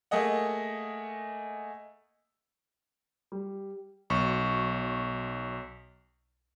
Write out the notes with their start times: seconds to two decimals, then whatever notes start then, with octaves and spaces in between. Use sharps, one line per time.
0.11 A3 A#3 G#4 D#5 F#5
3.32 G3
4.10 B1 C#6